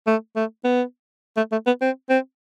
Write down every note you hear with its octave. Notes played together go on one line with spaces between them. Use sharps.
A3
A3
B3
A3
A3
B3
C4
C4